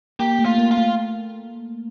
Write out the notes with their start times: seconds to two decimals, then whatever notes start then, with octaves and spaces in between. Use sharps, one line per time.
0.19 A#3 G4
0.39 A3
0.45 F4
0.58 A#3
0.71 F4
0.77 A3